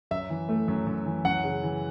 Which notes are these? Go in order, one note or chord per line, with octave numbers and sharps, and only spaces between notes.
F#2 E5
E3
A3
F#2
F#2
E3
F#2 F#5
C#3
E3